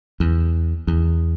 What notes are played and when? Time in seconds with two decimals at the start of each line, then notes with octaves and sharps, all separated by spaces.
0.20 E2
0.87 E2